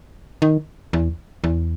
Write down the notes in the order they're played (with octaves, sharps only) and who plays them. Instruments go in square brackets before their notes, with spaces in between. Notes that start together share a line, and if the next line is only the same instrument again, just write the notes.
[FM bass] D#3
E2
E2